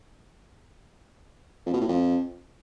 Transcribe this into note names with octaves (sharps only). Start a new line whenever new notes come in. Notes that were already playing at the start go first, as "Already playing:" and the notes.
F2
B2
A2
F2